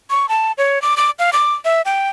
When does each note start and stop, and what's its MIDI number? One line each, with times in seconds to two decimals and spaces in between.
0.10 0.29 85
0.29 0.52 81
0.58 0.81 73
0.82 0.95 86
0.97 1.11 86
1.19 1.30 77
1.33 1.54 86
1.65 1.82 76
1.85 2.09 79